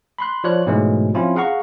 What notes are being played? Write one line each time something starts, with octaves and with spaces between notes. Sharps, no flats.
B5 C6 F#6
F3 F4 C#5 D5 F#6
G#2 B2 E3 F#3 G#3 A3
F3 C4 C#4 E4 F4
G#4 F5 F#5 A#5 C#6